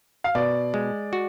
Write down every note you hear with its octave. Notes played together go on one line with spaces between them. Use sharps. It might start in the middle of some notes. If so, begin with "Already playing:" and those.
F5
B2 D5
G#3
F#4